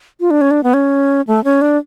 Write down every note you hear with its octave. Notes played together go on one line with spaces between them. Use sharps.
F4
D4
C#4
D4
B3
C#4
A3
C#4
D4